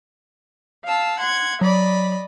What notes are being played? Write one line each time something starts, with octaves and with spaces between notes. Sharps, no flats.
F5 A5 E6
F#5 C6 G#6
F#3 D5 D#5 B5